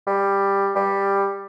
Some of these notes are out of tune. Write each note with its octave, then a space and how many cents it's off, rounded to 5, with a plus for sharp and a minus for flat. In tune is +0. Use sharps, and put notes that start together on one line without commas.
G3 +10
G3 +10